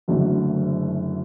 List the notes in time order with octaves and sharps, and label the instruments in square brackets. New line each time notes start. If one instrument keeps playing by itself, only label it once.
[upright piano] F#1 F#2 D3 A3